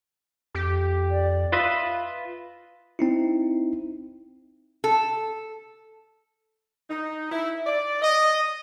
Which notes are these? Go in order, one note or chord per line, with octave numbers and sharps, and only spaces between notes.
F2 G4
D5
F4 B4 D#5 E5
C4 D#4 E4
A4
D#4
E4
D5
D#5